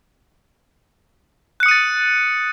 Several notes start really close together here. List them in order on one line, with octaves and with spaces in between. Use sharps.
F#6 C#7 D#6 D#7 A6